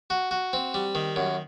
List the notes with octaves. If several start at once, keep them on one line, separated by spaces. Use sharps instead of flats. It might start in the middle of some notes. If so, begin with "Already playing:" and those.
F#4
F#4
C4
G3
D#3
F#2